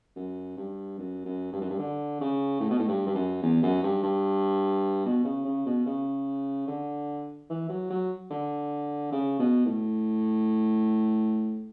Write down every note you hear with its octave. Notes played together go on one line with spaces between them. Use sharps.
F#2
G2
F#2
F#2
G2
F#2
G2
D3
C#3
A2
B2
A2
G2
G2
F#2
E2
F#2
G2
G2
B2
C#3
C#3
B2
C#3
D3
E3
F#3
F#3
D3
C#3
B2
A2